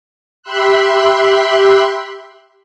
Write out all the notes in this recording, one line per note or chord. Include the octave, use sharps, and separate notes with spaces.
G4 E5 B5 C6 E6 F#6